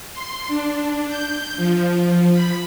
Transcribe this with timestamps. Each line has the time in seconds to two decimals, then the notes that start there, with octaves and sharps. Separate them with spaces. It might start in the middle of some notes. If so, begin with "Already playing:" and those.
0.13 C6
0.48 D4
1.08 G6
1.56 F3
2.32 B5